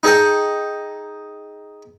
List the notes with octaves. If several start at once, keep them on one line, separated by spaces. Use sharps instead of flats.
D#4 G#4 A4 D#5 G5